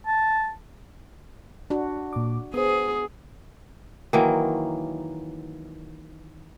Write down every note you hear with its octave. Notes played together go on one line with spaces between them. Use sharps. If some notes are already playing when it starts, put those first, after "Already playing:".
A5
D4 F#4
A#2 D6
B3 G#4 C5 D#6
D#3 E3 F#3 A#3